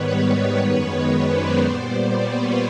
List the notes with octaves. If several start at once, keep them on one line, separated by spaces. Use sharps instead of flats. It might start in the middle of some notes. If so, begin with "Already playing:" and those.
Already playing: G#2 D#3 G3 B3 B4 C#5
F#2 D#3 G#3 B3
C5 D5
A#2 G3 B3
B4 C#5